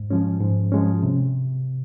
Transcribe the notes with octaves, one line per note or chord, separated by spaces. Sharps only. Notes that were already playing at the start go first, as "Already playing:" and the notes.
Already playing: G#2
F3 G#3 C#4
G#2
F3 G#3 C#4
C3